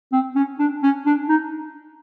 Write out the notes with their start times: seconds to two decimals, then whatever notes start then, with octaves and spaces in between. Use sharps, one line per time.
0.13 C4
0.36 C#4
0.59 D4
0.83 C#4
1.06 D4
1.29 D#4